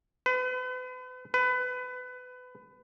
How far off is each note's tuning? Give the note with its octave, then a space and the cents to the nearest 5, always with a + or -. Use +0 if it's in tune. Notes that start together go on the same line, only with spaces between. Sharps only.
B4 +40
B4 +25